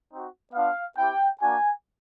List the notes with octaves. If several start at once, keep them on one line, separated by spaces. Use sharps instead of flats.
C4 D#4 F#4
B3 D4 F4 F5
C4 E4 G4 G5
A#3 D4 F#4 G#5